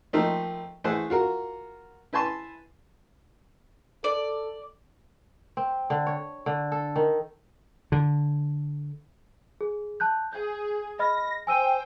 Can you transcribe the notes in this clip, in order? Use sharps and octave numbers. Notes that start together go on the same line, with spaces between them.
D#3 F3 A3 A#3 C4 D#4
E3 A3 G#4 C5 F#5
F4 F#4 A#4
E4 B4 G#5 A5 C6
A4 D5
C4
D3
C#5
D3
A4
D#3
D3
G#4
A5 F#6 G6
G#4 G6
D#5 B5 F6 A#6
C5 G5 G#5 E6 D#7